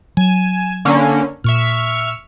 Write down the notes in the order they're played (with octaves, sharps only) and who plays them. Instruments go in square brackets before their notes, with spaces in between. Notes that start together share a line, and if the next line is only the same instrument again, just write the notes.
[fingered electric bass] F#3 [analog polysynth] G#5 E7
[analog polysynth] D3 A#3 C#4
[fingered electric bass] A#2 [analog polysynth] E5 C#6 F6